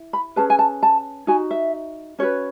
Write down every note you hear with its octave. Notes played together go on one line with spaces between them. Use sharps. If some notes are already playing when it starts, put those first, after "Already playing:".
Already playing: E4
B5
C#4 G#4 B4 A5
G#5
A5
A5
D#4 F#4 G#5
E5
C#4 F#4 B4 C#5